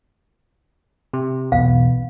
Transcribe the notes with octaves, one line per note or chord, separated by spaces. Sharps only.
C3
B1 E2 B2 B3 F5